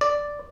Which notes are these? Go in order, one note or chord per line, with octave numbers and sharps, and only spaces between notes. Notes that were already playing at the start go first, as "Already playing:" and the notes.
D5